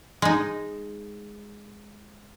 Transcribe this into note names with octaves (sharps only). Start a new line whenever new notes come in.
G#3 D#4